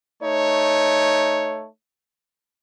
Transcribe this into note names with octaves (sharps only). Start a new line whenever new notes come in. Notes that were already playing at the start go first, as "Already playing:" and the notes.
A3 D#4 C#5